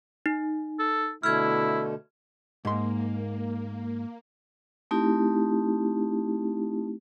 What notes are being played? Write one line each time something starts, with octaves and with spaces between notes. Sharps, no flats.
D#4
A4
B2 D3 A3 E4 F6 G#6
G#2 A#3 C6
A3 C4 D#4 E4 G4